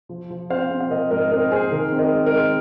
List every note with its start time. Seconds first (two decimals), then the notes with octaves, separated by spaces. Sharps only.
0.09 F3
0.30 F3
0.50 C4 C5 F5
0.70 C4
0.80 F5
0.90 F3 A#4 D#5
1.11 G#2 A#4 D#5
1.32 C4 A#4 D#5
1.51 C4 G#4 C5
1.72 D#3 A#4
1.92 C4
1.99 A#4 D#5
2.13 G#3
2.26 A#4 D#5
2.34 G#3